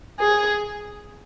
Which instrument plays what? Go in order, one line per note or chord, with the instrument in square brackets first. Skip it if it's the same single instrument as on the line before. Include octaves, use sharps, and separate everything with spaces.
[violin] G#4